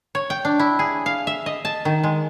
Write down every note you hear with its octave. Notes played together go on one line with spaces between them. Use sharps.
C#5
G5
D4
E4
G#4
F5
E5
D#5
A5
D#3
G#3